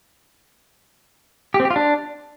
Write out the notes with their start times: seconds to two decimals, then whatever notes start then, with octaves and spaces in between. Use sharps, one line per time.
1.54 G4
1.60 C4
1.65 G4
1.70 F4
1.76 D4